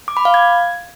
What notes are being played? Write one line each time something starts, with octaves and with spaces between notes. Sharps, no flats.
D6
B5
F5
G#6